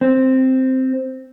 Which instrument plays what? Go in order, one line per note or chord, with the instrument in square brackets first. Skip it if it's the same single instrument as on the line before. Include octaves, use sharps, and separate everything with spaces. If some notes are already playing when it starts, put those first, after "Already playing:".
[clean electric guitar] C4